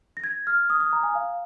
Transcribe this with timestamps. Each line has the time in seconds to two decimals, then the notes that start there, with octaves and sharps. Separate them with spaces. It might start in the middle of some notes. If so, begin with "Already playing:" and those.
0.17 A#6
0.24 G#6
0.47 F6
0.70 D#6
0.80 D#6
0.93 A#5
1.03 G#5
1.15 F5